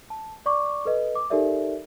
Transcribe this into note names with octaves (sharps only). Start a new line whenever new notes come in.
A5
D5 C#6 D6
A4 B4 D#5
D6
D#4 G4 A4 A#4 D5 E5